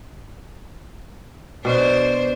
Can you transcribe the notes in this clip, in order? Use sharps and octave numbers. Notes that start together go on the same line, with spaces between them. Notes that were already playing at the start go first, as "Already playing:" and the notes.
B2 D4 C5